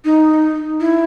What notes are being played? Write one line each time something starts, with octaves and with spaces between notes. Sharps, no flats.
D#4
E4